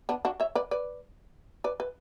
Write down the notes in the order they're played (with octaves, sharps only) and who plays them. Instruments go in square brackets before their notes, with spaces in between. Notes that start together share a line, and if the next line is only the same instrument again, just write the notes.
[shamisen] B3 D4
D4 F#4
C#5 E5
B4 D5
B4 D5
B4 D5
B4